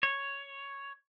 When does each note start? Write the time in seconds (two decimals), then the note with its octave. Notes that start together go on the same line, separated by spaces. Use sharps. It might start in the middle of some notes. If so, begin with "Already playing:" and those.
0.03 C#5